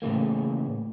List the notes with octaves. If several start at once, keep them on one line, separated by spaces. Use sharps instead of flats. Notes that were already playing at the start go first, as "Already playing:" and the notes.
A2 C#3 E3 A#3